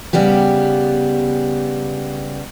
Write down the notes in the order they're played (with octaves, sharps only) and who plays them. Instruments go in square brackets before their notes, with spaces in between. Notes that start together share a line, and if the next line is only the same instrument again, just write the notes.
[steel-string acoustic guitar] C#3 G3 B3 G4